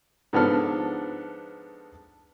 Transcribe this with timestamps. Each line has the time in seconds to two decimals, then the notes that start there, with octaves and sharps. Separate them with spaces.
0.33 G#2 F3 B3 D4 A4 F6